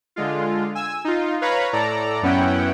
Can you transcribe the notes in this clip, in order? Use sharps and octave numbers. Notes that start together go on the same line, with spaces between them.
D3 G#3 F4
G#5 E6
D#4 F4
B4 C#5 F5 A#5 B5
A2 A4 D5 A#5
F#2 B3 C#4 E4 F#5 G5